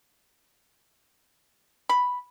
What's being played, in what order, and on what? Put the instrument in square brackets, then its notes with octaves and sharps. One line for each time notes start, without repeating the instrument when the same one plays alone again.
[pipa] B5